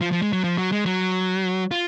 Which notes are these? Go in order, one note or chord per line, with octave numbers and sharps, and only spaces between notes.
F3
F3
G#3
F#3
F3
F#3
G#3
F#3
F4